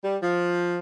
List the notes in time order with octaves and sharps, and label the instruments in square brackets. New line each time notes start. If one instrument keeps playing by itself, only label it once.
[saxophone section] G3
F3